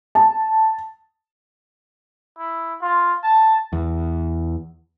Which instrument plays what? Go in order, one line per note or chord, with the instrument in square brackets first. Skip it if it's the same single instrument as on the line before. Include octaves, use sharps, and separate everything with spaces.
[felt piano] A5
[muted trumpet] E4
F4
A5
[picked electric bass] E2